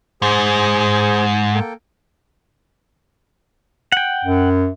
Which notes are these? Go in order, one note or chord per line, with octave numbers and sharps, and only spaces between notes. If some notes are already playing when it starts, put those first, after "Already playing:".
G#2 G#4 C5
A#3 A4 G5
F#5 G5
F#2